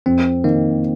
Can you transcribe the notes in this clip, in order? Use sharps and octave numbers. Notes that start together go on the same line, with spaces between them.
F2 C4
D#3 A#3